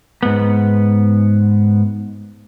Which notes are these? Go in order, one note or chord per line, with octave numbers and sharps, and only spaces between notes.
G#2 B3